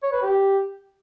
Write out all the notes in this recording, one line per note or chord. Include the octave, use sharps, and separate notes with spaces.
C#5
B4
G4